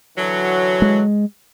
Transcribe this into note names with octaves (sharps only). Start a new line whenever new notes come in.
D3 E3 F#3
G#3